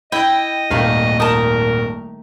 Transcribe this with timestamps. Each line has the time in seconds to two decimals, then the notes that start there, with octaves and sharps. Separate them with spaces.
0.12 E4 D#5 G5
0.70 D#1 G#1 D#3 A3 F5
1.20 D#4 A#4 A5 D#6